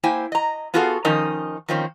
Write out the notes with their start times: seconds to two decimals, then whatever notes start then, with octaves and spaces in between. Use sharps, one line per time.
0.03 A#3 E4 C5 G5 G#5
0.32 D#5 A#5
0.74 B3 F4 F#4 G#4 A4 F5
1.05 D#3 F3 C#4 D#4 A#4 D#5
1.69 D#3 F3 A#3 C4 C#4